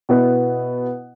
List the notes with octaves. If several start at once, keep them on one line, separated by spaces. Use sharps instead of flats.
B2 B3 E4